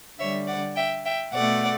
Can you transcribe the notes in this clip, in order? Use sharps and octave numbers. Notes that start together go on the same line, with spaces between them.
D3 G3 C#5 E5
D5 F#5
E5 G5
E5 G5
B2 A3 D5 F#5